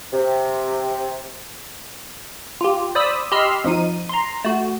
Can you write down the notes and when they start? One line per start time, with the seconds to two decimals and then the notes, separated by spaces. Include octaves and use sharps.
0.13 C3
2.61 F4 G4
2.95 C5 D5 B5 D#6 E6
3.32 G4 D#5 B5 C6 E6 F6
3.64 F2 F3 D#4 D#7
4.09 A#5 C6
4.45 A3 F#4